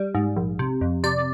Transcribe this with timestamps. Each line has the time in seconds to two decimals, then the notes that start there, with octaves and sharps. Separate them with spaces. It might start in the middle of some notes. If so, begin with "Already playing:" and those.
Already playing: G3
0.15 G#2
0.37 A#1
0.59 C3
0.81 F2
1.04 C3 D5